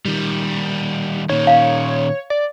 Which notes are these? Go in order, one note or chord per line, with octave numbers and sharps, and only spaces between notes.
D#3 G3
A#2 D#3 C#5
F5
D5